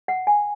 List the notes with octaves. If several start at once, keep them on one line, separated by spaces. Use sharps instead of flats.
F#5
G#5